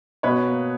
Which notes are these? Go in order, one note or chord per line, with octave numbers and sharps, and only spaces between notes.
B2 B4 C#5
A#3